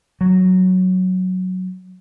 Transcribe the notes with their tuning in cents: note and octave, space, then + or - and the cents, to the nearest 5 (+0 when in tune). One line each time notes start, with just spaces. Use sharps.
F#3 +0